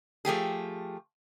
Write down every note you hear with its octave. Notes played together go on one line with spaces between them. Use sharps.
F3 A3 G4 G#4